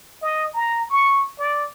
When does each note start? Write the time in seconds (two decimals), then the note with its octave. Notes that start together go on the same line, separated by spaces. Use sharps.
0.22 D#5
0.54 A#5
0.90 C#6
1.39 D5